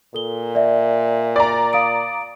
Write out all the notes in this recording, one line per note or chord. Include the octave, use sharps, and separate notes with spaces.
A#2 A4 G7
D5 E5
D5 A#5
F5 D#6 D7